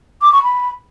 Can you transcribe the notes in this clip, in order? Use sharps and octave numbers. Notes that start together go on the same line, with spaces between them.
D6
C#6
B5